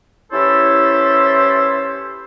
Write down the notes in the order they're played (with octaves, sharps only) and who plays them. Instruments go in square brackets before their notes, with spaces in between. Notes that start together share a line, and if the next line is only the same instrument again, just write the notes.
[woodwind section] E3 C#4 E4 G4 A4 C5